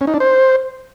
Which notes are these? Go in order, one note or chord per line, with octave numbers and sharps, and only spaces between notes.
C#4
D#4
D4
C5